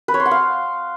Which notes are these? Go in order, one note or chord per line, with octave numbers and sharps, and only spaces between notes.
B4
C#5
C6
F#5
F5